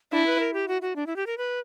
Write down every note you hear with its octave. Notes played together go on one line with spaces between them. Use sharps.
D4 E4
B4
A#4
G4
F#4
F#4
D4
E4
G4
A#4
B4